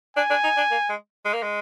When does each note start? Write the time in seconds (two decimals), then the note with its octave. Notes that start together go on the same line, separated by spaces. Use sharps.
0.17 D4 G#5
0.30 D4
0.44 D#4
0.57 D4
0.71 A#3
0.89 G#3
1.25 G#3
1.34 A#3
1.42 G#3